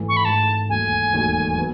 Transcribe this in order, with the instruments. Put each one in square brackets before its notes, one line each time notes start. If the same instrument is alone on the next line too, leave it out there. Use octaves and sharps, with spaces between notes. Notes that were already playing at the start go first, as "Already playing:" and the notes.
Already playing: [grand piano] G#1 G#2 E3 A3
[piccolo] C#6
B5
[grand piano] G#1 G#2 E3 A3 [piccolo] A5
[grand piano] E1 D#2 D#3 F#3 A3 [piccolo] G#5
[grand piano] E1 D#2 D#3 F#3 A3
F#3 B3